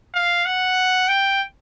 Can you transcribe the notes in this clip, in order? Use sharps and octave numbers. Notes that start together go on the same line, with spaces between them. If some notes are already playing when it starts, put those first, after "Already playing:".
F5
F#5
G5